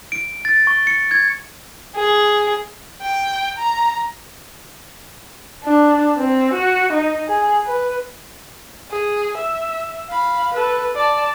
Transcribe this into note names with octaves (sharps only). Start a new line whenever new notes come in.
D7
A6
C#6
C#7
G#6
G#4
G5
A#5
D4
C4
F#4
D#4
G#4
B4
G#4
E5
F5 B5
A4 B4
D5 A5